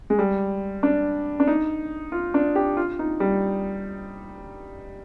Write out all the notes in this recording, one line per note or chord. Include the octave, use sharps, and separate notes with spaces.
G#3
G3
D4
D4
D#4
F4
D4
G4
F4
D#4
G3